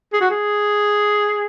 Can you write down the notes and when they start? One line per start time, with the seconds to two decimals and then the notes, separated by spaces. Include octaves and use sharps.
0.13 G#4
0.21 F#4
0.30 G#4